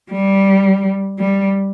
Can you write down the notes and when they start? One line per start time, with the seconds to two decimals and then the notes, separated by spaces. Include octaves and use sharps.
0.11 G3
1.19 G3